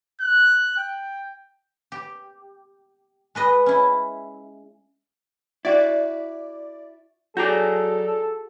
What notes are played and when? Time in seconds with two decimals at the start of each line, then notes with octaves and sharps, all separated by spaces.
0.21 F#6
0.77 G5
1.92 G4
3.35 G#3 B4 D#5
3.66 C#4 E4
5.65 E4 F#4 D5
7.37 F#3 F#4 G#4 A4 D5 A#5 G6